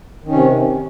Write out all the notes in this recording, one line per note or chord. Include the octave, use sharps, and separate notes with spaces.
C3 D#3 C#4